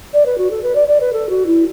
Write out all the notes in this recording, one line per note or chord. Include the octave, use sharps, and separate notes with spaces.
D5
B4
F#4
A4
B4
D5
D5
B4
A4
F#4
E4